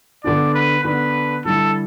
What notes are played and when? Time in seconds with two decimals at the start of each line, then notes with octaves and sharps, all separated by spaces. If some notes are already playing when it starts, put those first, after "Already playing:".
0.24 D3 B3 D4 D5
0.54 B4
0.84 D3 B3 D4 B4
1.45 D3 G3 E4 A4